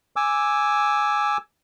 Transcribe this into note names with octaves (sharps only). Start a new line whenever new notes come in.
G#5 D6 E6